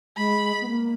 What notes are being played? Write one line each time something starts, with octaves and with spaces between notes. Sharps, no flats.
G#3 B5
B3
A#3